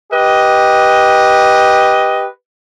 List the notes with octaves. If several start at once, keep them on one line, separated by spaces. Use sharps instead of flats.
G4 B4 D#5